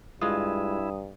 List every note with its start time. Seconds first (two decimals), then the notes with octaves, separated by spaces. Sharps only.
0.21 G2 G#3 E4 F4 D#6